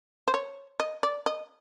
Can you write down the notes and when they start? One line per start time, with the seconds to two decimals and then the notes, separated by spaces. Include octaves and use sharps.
0.28 C5
0.34 C#5
0.80 D#5
1.03 D5
1.26 D#5